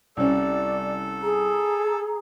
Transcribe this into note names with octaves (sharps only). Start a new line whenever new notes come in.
C2 C#4 A4 D5
G#4 A#5